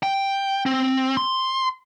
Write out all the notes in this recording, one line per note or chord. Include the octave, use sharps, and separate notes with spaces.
G5
C4
C6